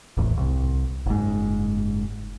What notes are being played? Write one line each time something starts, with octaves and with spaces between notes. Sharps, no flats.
D1 A1 E2
C2
F#1 G#2